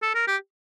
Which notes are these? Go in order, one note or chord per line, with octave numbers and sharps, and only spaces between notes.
A4
A#4
G4